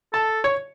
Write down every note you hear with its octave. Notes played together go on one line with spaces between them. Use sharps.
A4 A5
C#5